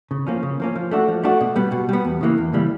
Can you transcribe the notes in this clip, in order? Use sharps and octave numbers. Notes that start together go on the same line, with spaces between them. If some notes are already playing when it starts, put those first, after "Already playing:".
C#3
F3 A#3 C#4
C#3
F3 A#3 C#4
F3
A3 D4 F#4
F3
A3 D4 F#4
B2
G3 B3
B2
G3 B3
E2
C#3 E3 G3 A#3
E2
C#3 E3 G3 A#3